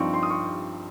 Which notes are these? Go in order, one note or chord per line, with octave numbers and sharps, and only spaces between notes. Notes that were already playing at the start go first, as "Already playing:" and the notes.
Already playing: G2 F3 C4 D#4 C#6
C6
D#6
C#6